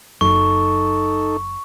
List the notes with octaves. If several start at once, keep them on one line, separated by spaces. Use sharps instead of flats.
F#1 F#2 D#4 A4 C#6